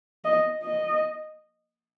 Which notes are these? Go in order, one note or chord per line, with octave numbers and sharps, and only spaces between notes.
D#5
D#5